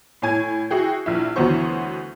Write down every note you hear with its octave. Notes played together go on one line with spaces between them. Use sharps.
A2 C#5 G#5 G#6
E4 F#4 G#4 G5
A#1 E4
D2 E3 F#3 B3 C5 C#6